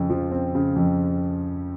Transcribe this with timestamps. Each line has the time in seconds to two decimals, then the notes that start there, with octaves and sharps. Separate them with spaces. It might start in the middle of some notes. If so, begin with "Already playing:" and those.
Already playing: F2 C#3
0.10 F3
0.32 C4
0.55 C#3
0.76 F2